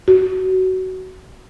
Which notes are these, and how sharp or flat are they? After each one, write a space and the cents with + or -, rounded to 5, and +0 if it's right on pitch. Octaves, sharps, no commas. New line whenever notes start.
F#4 +15